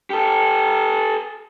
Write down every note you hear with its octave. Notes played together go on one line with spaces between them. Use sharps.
G4 A4